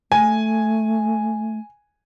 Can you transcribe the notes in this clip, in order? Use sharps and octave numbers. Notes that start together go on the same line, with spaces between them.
A3 G#5